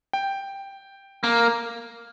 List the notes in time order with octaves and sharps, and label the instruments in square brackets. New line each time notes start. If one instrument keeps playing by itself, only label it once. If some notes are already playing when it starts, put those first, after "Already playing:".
[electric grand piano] G5
[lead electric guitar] A#3